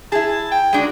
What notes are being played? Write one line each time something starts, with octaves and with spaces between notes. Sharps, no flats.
E4 G#4 A5
G5
G#3 D4 F#4